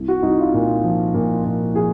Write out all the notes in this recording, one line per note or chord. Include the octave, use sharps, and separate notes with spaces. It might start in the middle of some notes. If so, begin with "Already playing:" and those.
Already playing: C2
F#4
C2 D#4
F4
A#2
F3
A#2
A#2
F3 G#4